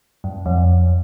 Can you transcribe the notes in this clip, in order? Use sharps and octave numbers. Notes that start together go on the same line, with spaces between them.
F#2
F2